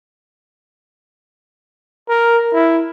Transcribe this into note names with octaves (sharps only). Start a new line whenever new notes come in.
A#4
E4